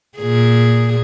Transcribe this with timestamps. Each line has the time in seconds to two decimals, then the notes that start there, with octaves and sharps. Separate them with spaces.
0.18 A#2 G#4